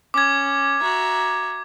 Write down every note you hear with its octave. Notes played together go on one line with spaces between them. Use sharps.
C#4 D6 G#6
F#4 E5 A#5